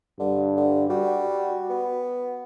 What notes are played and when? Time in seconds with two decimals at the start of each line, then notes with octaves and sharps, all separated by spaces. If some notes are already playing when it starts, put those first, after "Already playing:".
0.19 G2 D3
0.57 D3
0.90 G3 F#4
1.69 B3